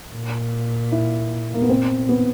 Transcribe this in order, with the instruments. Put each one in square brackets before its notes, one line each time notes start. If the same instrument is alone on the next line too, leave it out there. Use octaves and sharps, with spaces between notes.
[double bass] A#2
[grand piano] E4
A#3
B3
[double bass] A#2 [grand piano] C4
[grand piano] B3